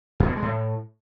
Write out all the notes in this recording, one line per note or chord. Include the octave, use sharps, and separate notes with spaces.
F#2
B2
G2
G#3
A2